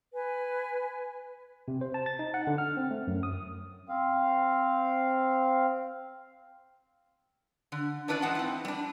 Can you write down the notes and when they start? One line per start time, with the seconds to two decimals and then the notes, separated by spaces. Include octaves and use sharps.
0.13 B4 G#5
1.68 C3
1.81 C5
1.94 A5
2.06 A6
2.19 D#4
2.34 F#5
2.47 D3
2.58 F6
2.77 C4
2.91 A3
3.08 F#2
3.23 D#6
3.89 C4 F5
7.72 D3
8.08 C#4 D4 E4 B4 C5 D5
8.22 G#2 E3 D#4 F#5 A5
8.35 C4 E4
8.65 G3 D4